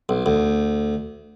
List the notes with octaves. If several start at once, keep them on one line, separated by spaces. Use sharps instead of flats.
B1
D2